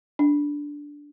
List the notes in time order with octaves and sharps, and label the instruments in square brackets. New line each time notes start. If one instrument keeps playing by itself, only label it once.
[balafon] D4